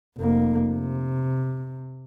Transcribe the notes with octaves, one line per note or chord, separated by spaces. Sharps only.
F1 A#3
C3